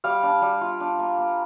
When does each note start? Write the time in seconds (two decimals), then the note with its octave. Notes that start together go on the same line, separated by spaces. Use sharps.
0.04 G3 F5
0.23 D4
0.42 G3
0.61 F4
0.80 D4
0.99 A#3
1.18 A#3